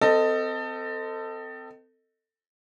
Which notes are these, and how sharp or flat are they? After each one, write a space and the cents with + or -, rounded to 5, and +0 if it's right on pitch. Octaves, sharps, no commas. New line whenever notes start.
C4 -25 A4 +20 D#5 +0